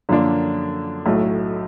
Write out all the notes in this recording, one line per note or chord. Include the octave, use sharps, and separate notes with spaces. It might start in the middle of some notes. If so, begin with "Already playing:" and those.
F#2 D3 F3 A#3 D4
B1 A2 F#3 A3